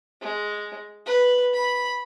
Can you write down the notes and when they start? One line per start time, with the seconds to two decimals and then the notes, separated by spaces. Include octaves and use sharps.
0.21 G#3
1.06 B4
1.54 B5